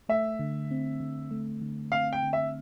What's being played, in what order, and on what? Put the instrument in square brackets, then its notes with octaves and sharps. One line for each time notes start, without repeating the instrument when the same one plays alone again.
[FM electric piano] A3 [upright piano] E5
[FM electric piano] D3
C4
D3
A3
D3
[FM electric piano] C4 [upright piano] F5
[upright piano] G5
[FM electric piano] D3
[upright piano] E5